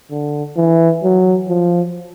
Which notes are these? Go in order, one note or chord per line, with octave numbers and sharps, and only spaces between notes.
D3
E3
F#3
F3